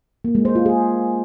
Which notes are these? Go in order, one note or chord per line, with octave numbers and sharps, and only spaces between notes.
A#3
G#3
C5
F4
G#4